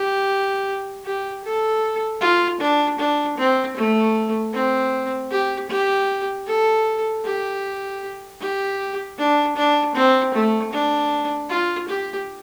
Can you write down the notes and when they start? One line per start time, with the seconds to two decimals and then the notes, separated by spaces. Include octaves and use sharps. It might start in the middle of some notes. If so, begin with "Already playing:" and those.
Already playing: G4
1.05 G4
1.44 A4
2.21 F4
2.60 D4
2.98 D4
3.37 C4
3.77 A3
4.53 C4
5.31 G4
5.69 G4
6.46 A4
7.24 G4
8.40 G4
9.18 D4
9.56 D4
9.95 C4
10.34 A3
10.73 D4
11.50 F4
11.88 G4